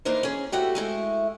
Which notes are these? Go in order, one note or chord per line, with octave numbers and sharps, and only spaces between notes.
E3 A#3 D4 D#4 A#4 C5
C#4 G#4
A3 E4 F#4 G4
G#3 A3 E4